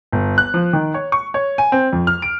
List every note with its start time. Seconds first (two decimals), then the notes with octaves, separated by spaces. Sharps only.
0.12 G1
0.38 F#6
0.54 F3
0.73 D#3
0.94 C#5
1.12 C#6
1.34 C#5
1.58 G#5
1.72 C4
1.93 F2
2.07 F6
2.22 D7